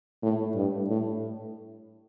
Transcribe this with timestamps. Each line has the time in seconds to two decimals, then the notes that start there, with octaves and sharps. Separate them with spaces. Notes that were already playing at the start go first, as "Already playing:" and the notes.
0.22 A2
0.55 G2
0.89 A2